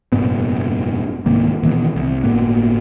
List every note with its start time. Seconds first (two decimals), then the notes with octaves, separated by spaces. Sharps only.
0.12 F1 G2 A#2 B3
1.26 C2 G#2 D#3 A#3
1.63 A#2 D#3 E3 B3
1.96 C2
2.24 G1 A2 A#3 B3